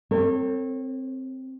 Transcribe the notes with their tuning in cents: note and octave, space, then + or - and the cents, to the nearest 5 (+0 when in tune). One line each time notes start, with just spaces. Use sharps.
C4 +0 A4 +45 C#5 -30